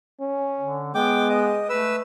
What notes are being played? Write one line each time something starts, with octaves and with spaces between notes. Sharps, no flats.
C#4
D3
G#3 B3 G5 D6
D#5
A3 B4 E6